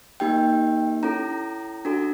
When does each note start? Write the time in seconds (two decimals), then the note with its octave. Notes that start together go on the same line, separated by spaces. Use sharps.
0.20 A#3 D#4 G4 G5
1.03 C#4 E4 A4 A#5
1.85 D4 F#4 A4